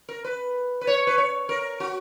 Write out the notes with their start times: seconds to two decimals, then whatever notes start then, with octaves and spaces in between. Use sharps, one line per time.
0.09 A#4
0.24 B4
0.81 B4
0.87 C#5
1.07 B4
1.18 C#5
1.49 A#4
1.80 F#4